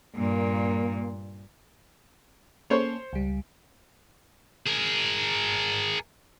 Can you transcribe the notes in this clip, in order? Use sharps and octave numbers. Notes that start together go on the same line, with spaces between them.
G2 A#2 A#3
A#3 C#4 A4 C5 C#5
C#2 G3
G#4 A#4